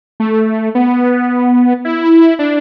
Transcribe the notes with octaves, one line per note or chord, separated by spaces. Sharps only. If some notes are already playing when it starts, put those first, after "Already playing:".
A3
B3
E4
D4